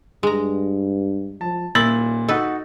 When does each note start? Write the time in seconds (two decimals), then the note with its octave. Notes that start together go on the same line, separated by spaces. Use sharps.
0.23 G2 G#3 A#5
1.41 F3 A5
1.75 D#1 A#2 E4 A6 F#7
2.28 D#4 F#4 A4 B4